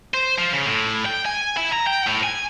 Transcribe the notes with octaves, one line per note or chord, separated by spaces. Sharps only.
C5
F3
C#3
A2
G5
G#5
E4
A#5
G5
A2
G#5